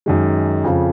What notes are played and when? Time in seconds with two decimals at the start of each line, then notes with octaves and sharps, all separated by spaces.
0.06 F#2 D#3 G#3
0.64 F2 C#3 F3